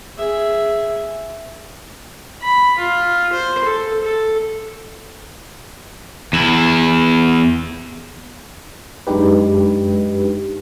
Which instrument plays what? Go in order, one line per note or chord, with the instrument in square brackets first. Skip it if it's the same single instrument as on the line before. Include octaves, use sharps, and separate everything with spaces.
[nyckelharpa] G#4 E5
B5
F4
C5
A4
A4
[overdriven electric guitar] E2 E4
[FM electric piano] F#2 G#3 D4 D#4 G4 B4